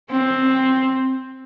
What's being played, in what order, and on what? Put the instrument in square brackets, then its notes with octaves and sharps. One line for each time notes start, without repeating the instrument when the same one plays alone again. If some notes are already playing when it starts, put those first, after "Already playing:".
[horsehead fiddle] C4